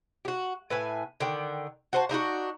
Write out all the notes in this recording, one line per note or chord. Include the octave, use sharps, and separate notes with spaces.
F#4 G4
A2 B4 E5 G#5
D3 D#3 G5
F#4 C5 A5
D4 D#4 F4 F#4